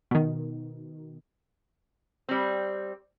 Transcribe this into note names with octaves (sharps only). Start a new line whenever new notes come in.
B2 D#3
G3 C4